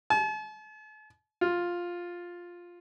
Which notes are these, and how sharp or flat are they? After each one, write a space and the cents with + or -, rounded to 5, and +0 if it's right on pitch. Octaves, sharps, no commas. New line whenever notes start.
A5 -45
F4 +5